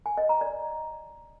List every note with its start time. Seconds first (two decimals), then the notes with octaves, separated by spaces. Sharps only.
0.06 G#5
0.17 D#5
0.29 A#5
0.41 D5